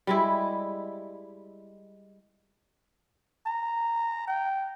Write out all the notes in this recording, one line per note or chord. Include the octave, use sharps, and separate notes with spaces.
G3 G#3 E4
A#5
G5